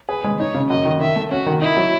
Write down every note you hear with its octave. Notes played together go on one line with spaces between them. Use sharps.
G#4 B4
G#3
D#4 C#5
C#3
F#2 D#5
D#3
D#3 E5
A3
C#4 F#4
D#3
D#4 E4
F#3